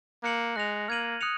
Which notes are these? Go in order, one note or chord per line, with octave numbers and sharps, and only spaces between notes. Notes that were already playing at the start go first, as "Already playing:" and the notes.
A#3 F#6 C#7 F#7
G#3 F#6 A#6 F7
A#3 F6 G#6 D#7 F#7
D#6 F#6 C#7 F7